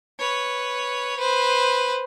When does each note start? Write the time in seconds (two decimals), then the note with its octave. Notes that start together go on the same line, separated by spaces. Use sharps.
0.19 B4 C#5
1.18 B4 C5